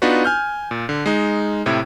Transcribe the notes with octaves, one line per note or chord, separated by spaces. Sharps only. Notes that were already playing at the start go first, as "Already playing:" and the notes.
B3 D4 D#4 F4 F#4 B4
G#5 F6 G6
A#2
D3
G#3 D#4
A2 C3 E4